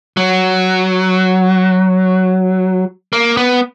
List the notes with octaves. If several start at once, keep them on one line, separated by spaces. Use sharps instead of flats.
F#3
A#3
B3